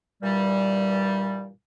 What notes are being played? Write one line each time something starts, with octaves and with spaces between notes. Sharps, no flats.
G2 A#2 E3 G3